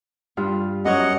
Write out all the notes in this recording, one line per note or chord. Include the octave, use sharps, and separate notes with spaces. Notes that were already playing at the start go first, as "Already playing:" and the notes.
G2 F4
F#2 C#5 D#5 F#5